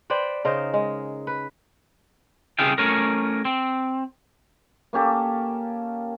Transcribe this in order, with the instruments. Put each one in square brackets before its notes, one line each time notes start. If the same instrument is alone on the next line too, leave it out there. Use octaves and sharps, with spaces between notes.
[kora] B4 C5 D5 G5
C#3 D#4 A#4 C5
G#3
B4
[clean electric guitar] C2 C#3 G#4 E5 F5 G5
A3 C#4 A#4
C4
[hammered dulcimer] A#3 C#4 G4 A4